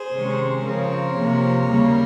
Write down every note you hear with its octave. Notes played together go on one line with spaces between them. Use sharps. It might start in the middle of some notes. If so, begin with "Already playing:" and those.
Already playing: G#4 C5
C3 D#3 G#3 C#4
C#3 F3 C4 A#4 C#5
C3 F3 A#3
D#2 C#3 G3 A#3